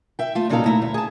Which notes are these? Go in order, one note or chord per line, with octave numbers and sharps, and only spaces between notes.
E5 G5
A3 F4
A#2 C#3 F#3 D#4 A4 F5
A3 E4 A#5
D2 E5
G#4 A5